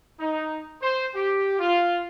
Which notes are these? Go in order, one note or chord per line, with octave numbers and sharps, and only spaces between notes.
D#4
C5
G4
F4